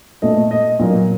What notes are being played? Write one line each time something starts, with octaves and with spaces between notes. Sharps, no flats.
A#2 A3 D#5
D#5
A#2 F#3 A#3